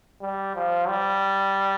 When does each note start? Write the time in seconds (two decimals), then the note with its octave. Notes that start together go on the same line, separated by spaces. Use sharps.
0.21 G3
0.55 F3
0.88 G3